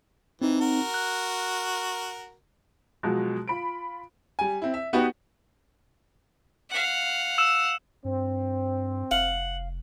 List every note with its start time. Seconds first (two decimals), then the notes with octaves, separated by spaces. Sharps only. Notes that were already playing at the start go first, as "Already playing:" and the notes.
0.42 E3 C4 D#4
0.61 F#4 A#4
0.94 F#6
3.03 B2 F3 F#3 G#3
3.48 F4 B5 D7
4.39 G3 G#5
4.62 C4 E4
4.74 E5
4.93 B3 D#4 F#4 G4 B4
6.70 F5 F#5
7.38 E6 E7
8.05 G2 C4
9.11 F1 F5 F#5